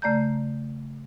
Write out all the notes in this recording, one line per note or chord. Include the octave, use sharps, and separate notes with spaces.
C#3 A3 D5 A#5 G6